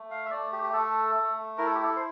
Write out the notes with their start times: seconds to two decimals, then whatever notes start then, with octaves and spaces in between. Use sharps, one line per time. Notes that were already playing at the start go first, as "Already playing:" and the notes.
Already playing: A3
0.11 F5
0.25 E5
0.31 A3 D5
0.52 G4
0.63 G4
0.73 A3 A4
1.15 A3
1.58 E4 A#4
1.66 A4
1.75 G4
1.83 A4
1.96 C5